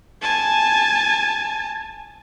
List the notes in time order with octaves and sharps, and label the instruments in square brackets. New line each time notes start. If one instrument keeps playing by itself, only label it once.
[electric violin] G#5 A5